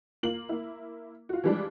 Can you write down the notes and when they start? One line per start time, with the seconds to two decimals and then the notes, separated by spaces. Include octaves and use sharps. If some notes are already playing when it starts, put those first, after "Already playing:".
0.23 A#3 F4 F#7
0.49 A#3 E4
1.29 F4 F#4
1.44 E3 F3 G3 G#3 D4